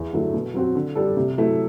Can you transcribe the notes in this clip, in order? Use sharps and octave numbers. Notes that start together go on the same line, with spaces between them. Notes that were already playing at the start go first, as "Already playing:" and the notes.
Already playing: E2
D3 F#3 A3 E4
B2
F#3 C4 F#4
D3
G3 D4 A4
C3
F#3 A3 E4